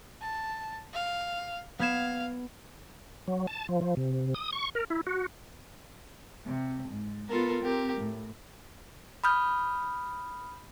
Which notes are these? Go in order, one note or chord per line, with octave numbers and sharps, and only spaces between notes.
A5
F5
B3 F5 G#6 E7
F#3
A5
F3
F3
C3
D#6
C#6
A#4
E4
F#4
C3
G#2
B3 F4 A4 A#4
C4 G4 A#4
A2
B5 D#6 F6 G6